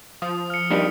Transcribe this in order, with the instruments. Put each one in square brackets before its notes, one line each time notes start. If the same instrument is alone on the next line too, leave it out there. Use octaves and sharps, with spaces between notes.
[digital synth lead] F3 [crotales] D#6
[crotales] F6 C#7
[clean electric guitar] G2 D#3 G3